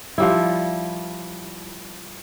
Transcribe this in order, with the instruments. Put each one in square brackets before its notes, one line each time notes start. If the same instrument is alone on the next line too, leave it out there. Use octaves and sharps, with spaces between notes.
[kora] F3 G3 E4